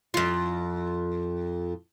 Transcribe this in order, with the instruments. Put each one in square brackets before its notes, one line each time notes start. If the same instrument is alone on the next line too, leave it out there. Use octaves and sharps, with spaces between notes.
[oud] F2 F4